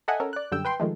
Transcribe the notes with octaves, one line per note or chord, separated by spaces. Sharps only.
A4 D#5 E5 F#5 G#5
C#4 A4 A#4
D5 F#6
F#2 D3 G3 G5 E6
B4 G5 C6
D#3 F3 G#3 A3